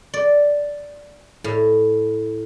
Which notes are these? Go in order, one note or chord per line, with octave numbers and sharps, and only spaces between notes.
D5
A2